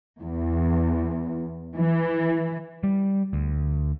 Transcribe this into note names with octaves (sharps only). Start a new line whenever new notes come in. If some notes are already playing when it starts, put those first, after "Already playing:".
E2
E3
G3
D2